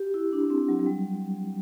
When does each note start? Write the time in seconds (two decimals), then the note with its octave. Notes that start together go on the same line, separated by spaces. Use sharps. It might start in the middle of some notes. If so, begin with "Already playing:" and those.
Already playing: F#4 G4
0.14 E4
0.33 D4
0.50 C4
0.68 F#3
0.79 F#3
0.86 G3